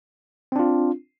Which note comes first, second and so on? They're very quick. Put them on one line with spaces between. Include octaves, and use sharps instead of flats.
C4 D4 F4